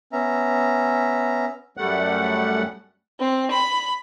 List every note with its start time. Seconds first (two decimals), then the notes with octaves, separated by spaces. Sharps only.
0.13 B3 C#4 E5 A#5
1.77 F#2 G3 A3 F#5
3.20 C4
3.51 B5